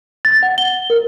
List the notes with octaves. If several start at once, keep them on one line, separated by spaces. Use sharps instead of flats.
A6
F#5
G7
A#4